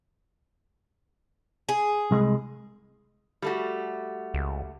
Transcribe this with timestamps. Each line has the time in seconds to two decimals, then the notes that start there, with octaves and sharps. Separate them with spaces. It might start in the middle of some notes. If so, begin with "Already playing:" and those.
1.69 G#4
2.11 C2 G#3
3.42 G3 A3 F#4
4.34 C#2